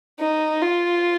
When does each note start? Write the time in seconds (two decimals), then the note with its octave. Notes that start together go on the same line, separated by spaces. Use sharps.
0.20 D#4
0.62 F4